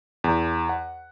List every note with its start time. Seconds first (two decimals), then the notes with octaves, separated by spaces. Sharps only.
0.24 E2
0.69 F#5